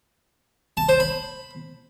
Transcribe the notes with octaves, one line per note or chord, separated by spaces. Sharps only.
A5
C5
B5